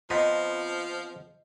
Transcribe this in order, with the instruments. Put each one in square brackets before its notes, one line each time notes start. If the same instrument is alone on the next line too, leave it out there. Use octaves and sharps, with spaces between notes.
[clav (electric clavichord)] F2 B3 A#5 [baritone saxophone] F3 [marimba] D#5 C6 G6